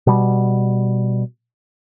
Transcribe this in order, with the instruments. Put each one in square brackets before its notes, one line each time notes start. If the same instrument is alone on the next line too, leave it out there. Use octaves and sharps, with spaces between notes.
[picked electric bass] B2 G3